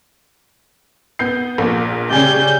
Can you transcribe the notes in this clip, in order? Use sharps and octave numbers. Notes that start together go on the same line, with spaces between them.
B3 G6 C7
A#1 A#2
C#3 G3 C#4 G#4 D5 G6